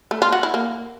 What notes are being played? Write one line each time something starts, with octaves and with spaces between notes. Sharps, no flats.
A3
F4
F#4
E4
A#3